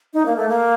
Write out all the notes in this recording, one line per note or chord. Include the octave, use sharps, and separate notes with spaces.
D#4
A#3
A3
A#3